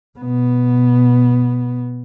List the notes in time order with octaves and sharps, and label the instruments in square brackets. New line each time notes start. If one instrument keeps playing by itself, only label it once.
[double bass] B2 B3